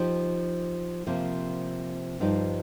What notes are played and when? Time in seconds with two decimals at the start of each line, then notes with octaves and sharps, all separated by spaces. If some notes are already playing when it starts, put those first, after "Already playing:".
Already playing: F3 D#4 G4
1.07 C3 F3 A#3
2.20 G2 F3 D#4 G4